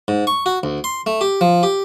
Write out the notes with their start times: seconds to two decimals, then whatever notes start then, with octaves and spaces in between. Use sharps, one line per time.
0.08 G#2
0.27 C#6
0.46 F#4
0.63 D2
0.84 C6
1.06 A3
1.21 G4
1.41 F3
1.63 G4